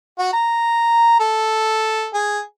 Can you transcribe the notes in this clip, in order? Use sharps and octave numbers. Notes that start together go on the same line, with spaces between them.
F#4
A#5
A4
G#4